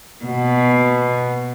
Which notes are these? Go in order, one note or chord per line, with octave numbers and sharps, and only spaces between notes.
B2